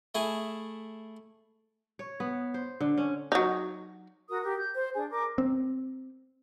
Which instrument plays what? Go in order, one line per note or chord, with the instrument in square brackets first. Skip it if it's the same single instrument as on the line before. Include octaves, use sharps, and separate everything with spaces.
[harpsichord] A3 E4 G#4
[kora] C#5
B3
C5
D3
C#4
[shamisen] F#3 D#4
[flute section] F#4 A#4 D#6
G4 A#4
G6
C5
D4 G#4
A#4 D6
[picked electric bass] C4